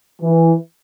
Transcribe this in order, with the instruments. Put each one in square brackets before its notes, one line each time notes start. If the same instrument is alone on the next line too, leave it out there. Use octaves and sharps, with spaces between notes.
[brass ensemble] E3